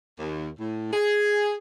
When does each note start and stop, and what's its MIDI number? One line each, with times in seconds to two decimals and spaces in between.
0.20 0.49 39
0.60 0.93 45
0.93 1.56 68